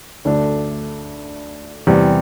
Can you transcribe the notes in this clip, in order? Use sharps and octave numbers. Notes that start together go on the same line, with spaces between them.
D2 D3 A3 D4
E2 C3 G3